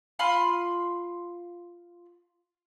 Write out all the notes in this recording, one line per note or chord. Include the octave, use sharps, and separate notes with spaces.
F4 B5 C6